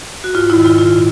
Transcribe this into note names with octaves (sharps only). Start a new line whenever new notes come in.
F#4
G#2 F4
E4
D#3
F4
A#2 F4